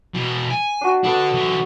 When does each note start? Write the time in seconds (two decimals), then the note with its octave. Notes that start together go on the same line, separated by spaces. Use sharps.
0.14 B2 E3
0.51 G#5
0.81 D4 F#4
1.04 D3 B3 D4 A4
1.34 D3 E3